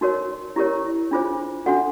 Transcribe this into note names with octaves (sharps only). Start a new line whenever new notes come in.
D#4 F#4 A#4 C#5
E4 G4 A#4 C#5
D4 F4 G#4 C5
D4 F#4 A4 F#5